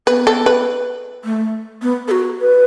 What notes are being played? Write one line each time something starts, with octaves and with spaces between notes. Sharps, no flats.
B3 B4
A4
B4
A3
B3
A4
F#4
B4